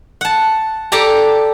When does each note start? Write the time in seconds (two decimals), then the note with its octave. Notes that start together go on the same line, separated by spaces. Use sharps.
0.21 F#5 A5
0.92 G4 A4 D5 A5 A#5